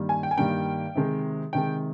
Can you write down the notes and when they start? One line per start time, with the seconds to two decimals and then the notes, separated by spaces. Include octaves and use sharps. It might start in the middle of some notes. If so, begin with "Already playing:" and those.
Already playing: G2 D#3 G3 A#3
0.09 G#5
0.23 G5
0.31 G#5
0.37 G2 D#3 G3 A#3 G5
0.95 C3 D#3 G#3
1.53 C3 D#3 G#3 G5